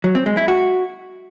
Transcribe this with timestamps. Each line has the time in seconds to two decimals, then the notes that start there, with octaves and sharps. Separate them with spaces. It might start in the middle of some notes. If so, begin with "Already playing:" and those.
0.04 F#3
0.15 C4
0.26 G#3
0.37 E4
0.48 F#4